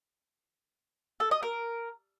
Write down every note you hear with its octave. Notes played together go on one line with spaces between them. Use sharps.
A4
D#5
A#4